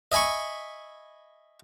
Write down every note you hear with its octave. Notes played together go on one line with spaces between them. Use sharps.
D#5 E5 G#5 B5 C#6